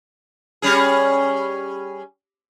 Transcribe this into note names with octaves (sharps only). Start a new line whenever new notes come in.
G3 C#4 G#4